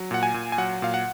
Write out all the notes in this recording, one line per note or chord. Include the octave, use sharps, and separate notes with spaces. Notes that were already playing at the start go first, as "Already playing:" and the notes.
Already playing: F#3
A#2 F#5
G#5
A#2
G#5
F#3 F#5
A#2 F5
F#5